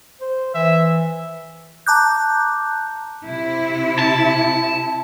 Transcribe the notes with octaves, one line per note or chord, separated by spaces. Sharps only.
C5
E3 E5
A5 A#5 D6 F#6 G6
C3 E4
A5